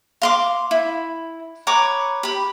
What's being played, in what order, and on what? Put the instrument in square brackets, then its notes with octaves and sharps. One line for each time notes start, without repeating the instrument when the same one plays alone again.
[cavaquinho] F5 C6 D6
E4
B4 C#5 A#5 D6
G4 B5